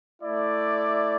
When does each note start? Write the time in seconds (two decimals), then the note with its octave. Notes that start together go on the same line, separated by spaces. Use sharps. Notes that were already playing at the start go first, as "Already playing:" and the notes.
0.21 A3 E4 D5